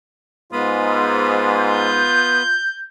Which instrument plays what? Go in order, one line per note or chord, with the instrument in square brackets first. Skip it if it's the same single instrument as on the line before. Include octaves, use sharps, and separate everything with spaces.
[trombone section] G#2 [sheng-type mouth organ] B3 B5 D#6 [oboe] F4
[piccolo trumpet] G6